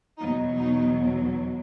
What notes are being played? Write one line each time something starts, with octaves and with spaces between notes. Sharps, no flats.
E2 B2 F#3 D#4
D#4